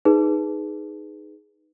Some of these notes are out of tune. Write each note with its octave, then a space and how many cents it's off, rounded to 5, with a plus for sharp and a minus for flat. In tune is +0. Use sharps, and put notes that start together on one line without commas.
D#4 +0 G#4 +0 B4 +0